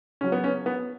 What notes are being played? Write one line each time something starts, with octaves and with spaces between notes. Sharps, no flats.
C#3 F#3 C#4
B3
C#4
B3